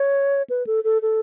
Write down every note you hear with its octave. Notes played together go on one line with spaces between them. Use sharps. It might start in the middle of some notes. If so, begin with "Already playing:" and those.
Already playing: C#5
B4
A4
A4
A4